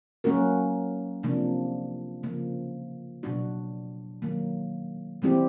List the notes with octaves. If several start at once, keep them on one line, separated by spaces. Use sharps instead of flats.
F#3 A#3 C#4 F#4 A#4
C3 F3 A#3 D4
C#3 F3 A#3
B2 F#3 B3 D4 F#4
D#3 F#3 A#3
E3 G3 C4 E4 G4